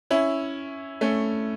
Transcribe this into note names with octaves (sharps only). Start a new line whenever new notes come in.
C#4 E4
A3 C#4